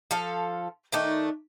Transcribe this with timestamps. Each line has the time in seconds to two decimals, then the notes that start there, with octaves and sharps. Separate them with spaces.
0.11 F3 A4 F5
0.92 D#3 A3 D4 D#4